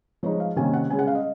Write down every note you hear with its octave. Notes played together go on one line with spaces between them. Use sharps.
F3 G#3 D#4 C#5
F5
C3 D#3 A#3 C#4 G#5
F#5
C#3 G#3 C#4 G#5
F#5
F5
D#5